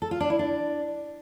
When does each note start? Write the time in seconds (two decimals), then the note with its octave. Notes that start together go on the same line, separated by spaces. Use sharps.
0.02 A4
0.11 F4
0.20 D4
0.30 E4
0.39 D4